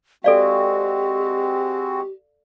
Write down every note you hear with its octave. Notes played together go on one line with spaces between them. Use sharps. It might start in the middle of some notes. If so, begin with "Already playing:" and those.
G#3 C4 F#4 G4 A4 D5 F5